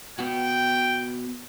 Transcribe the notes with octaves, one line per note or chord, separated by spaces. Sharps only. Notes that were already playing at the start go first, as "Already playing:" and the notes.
B3 F#4 G5